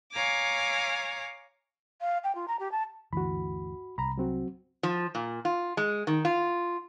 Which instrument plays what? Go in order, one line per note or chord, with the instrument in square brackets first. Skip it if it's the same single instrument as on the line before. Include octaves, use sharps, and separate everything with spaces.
[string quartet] C#5 F5 G#5 A#5 D6
[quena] F5
G5
F4
A#5
G4
A5
[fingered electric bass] G1 D2 E3 [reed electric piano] F#4 B5
[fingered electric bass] C2 [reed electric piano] A#5 B5
[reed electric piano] F#3 C4 F#4
[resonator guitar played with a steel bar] F3
A#2
F4
G#3
D#3
F4